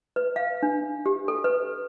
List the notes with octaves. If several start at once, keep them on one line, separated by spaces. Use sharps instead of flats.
B4
F5
D4
G4
A4
B4